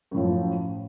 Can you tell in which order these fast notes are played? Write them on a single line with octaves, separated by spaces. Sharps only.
F#2 A2 F3